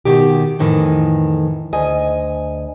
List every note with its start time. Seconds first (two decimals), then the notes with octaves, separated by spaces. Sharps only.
0.05 B2 D#3 G4
0.59 F2 A2 D#3 E3
1.73 D2 D#5 G#5